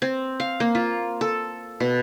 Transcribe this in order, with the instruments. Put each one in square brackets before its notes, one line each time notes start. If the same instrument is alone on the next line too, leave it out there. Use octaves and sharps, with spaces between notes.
[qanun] C4
F5
A#3
F4
A4
B2